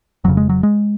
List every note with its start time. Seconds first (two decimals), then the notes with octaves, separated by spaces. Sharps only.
0.24 F1 F2 C#3 F#3
0.37 G#3
0.49 F#3
0.63 G#3